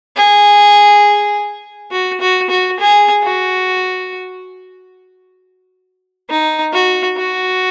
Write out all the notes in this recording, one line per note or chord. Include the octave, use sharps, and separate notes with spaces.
G#4
F#4
F#4
F#4
G#4
F#4
D#4
F#4
F#4